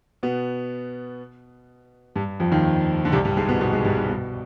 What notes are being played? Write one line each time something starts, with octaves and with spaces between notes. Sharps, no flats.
B2 B3
G2 G3
F2 F3
D#2 D#3
D3
C2 C3
G2 G3
G#2 G#3
B2 B3
B2 B3
G#2 G#3
G2 G3
G#2
B2